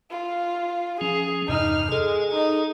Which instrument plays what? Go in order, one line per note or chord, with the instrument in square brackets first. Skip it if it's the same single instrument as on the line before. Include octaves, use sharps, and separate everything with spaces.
[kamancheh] F4
[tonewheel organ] F3 C#4 [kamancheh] G#4
[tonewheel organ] E2 G2 C3 [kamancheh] D#4 F6
[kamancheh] G#3 [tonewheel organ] G#4 A4
[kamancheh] D#4